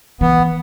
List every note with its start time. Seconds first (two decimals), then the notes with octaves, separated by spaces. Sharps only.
0.21 E3 B3